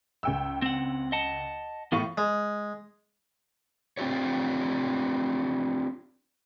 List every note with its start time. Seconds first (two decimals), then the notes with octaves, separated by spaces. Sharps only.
0.23 C#2 G5 E6
0.62 C4 F#5
1.12 D#5 F#5 A5
1.92 A2 E3 B3 F4 F5 C#6
2.18 G#3
3.97 C4 D4 F4 G4 C#5